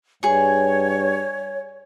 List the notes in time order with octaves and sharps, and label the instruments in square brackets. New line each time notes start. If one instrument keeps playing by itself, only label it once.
[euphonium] G2 [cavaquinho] G#4 C#6 [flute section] C#5